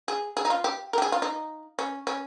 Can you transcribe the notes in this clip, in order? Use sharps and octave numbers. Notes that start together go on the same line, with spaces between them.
G#4
G#4
D#4
F4
G4
A#4
G4
G#4
F4
D#4
C#4
C#4